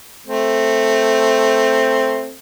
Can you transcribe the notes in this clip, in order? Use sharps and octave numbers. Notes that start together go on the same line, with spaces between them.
A3 C4